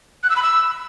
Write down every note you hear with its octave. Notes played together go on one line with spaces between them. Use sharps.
F#6
E6
B5
E6